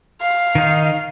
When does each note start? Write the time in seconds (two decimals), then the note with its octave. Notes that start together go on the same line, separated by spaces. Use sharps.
0.21 F5
0.55 D#3 D#4